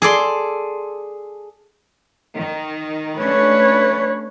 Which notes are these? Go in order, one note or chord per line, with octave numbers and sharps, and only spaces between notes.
G#4 A4 D5 C6
D#3
A3 C#4 D4 B4 C#5